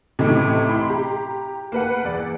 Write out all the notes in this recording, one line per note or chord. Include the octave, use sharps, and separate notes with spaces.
A2 C3 E3 A3 D#4
B5 C6
G4 A#5
A#3 B4 F#5
E2 D5